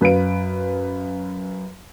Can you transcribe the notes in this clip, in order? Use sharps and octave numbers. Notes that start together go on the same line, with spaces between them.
F#2 B4 F5 D7